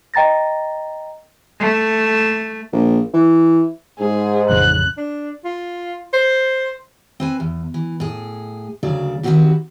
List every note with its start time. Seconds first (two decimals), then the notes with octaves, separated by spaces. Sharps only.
0.14 D#5 G5 A#5 A6 A#6
1.60 A3
2.72 A#1
3.14 E3
3.99 G#2 G#4
4.49 A1 F2 C#3 F#6
4.97 D4
5.45 F4
6.13 C5
7.20 C4 B4 G#5
7.40 E2
7.74 E3
8.00 A2 G#4
8.83 D2 C#3 F#3 D5
9.23 D#3 E3 F#3 C4 F#4 G4